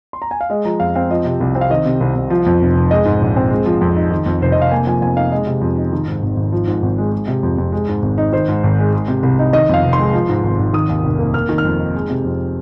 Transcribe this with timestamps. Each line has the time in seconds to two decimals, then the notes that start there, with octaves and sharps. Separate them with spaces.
0.13 C6
0.22 A#5
0.31 G#5
0.41 F5
0.50 G#3 D#5
0.65 F3 A#5
0.80 F2 F5
0.95 C4 F5
1.10 F3 D#5
1.25 C3
1.40 C2
1.55 C4
1.61 F5
1.70 D#3 D#5
1.85 C3
2.01 C2
2.15 C2
2.30 F3
2.46 F2
2.61 F1
2.75 F1
2.91 G#3 D#5
3.05 G#2
3.22 A#1
3.36 C4
3.51 G#3
3.66 F3
3.81 F2
3.96 D#4
4.11 D#3
4.26 F2
4.41 F1 C5
4.52 F1 D#5
4.62 F5
4.71 A#3 G#5
4.86 F3 G#5
5.01 F2 G#5
5.16 D#4 F5
5.32 G#3 D#5
5.47 C3
5.61 F2
5.77 D#4
5.92 D#3
6.07 G#2
6.22 G#1
6.37 G#1
6.52 F3
6.67 G#2
6.82 G#1
6.98 G#3
7.12 G#3
7.28 C3
7.43 F2
7.58 F2
7.72 G#3
7.88 G#2
8.02 G#1
8.18 D#4
8.33 D#3 C5
8.48 G#2
8.64 G#1
8.78 G#3
8.93 G#3
9.08 C3
9.23 C2
9.39 D#4
9.53 D#3 D#5
9.69 F2 F5
9.84 F1
9.93 C6
9.99 G#3
10.13 F3
10.29 G#2
10.43 G#1
10.59 G#1
10.73 D#3 D#6
10.89 D#2
11.03 F1
11.19 A#3
11.34 A#3 F6
11.49 D#3
11.58 F6
11.65 F2
11.79 D#4
11.95 G#3
12.10 C3
12.25 F2